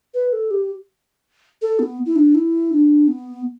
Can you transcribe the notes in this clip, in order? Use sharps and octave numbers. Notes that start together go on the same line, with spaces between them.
B4
A4
G4
A4
B3
E4
D4
E4
D4
B3